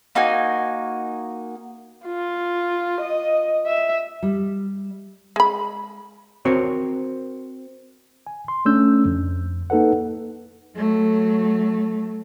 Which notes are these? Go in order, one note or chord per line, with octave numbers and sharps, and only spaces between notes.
A#3 D#4 F#4 G#5
F4
D#5
E5
G3
G#3 B5
C4 F#4 A#4 C#5
G#5
C6
A3 C#4 D4 E6 G6
F2
A#3 D#4 A4 B4 F#5
F#3 A3